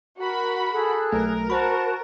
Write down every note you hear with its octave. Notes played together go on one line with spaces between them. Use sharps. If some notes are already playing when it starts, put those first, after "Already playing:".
F#4 A#4 B5
G#4 A4 F#6
B1 A3 A#4
F#4 C5 A5 B5 F#6